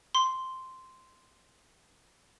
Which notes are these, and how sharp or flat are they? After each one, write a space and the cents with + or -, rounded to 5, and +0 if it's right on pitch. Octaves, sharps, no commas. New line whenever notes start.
C6 -5